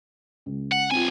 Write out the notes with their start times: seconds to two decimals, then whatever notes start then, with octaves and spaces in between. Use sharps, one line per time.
0.46 C#2
0.72 F#5
0.91 B1 C4 F4 G#5